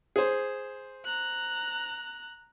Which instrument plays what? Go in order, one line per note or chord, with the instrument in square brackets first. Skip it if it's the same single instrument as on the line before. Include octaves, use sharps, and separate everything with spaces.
[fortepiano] G#4 C5
[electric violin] A#5 F#6